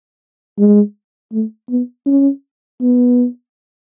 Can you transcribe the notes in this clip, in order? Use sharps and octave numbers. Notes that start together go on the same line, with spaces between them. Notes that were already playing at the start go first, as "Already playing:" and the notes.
G#3
A3
B3
C#4
B3